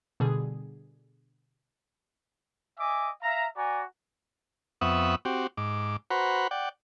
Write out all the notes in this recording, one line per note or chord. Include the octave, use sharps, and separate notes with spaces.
B2 D3 G3 G#4
D#5 E5 G#5 D6
E5 F5 A#5
F#4 D5 G#5 A#5
F2 B3 E5 F#5 C#6 D#6
C4 F#4 G4
G#2 D6
F#4 B4 C5 F#5 A#5 B5
D5 F#5 G5